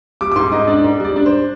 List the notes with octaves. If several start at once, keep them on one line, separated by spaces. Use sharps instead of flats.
G3 D6
D6
G#2 C6
G#2 D#5
D4 D5
G#2
G3 D5
D4
C5